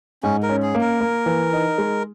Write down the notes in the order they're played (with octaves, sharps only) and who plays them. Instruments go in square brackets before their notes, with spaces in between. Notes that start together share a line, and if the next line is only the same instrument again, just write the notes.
[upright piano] G#2 [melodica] C#4
[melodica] A#4
[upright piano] C#4
[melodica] G#4
[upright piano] A#3
[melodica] A#4
[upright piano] A#3
E3
D#4
G#3